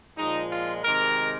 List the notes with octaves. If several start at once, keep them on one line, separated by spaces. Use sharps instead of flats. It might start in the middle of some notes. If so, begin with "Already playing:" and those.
A#2 F3 G#3 D#4
F4
C3 D#3 G#3 A#4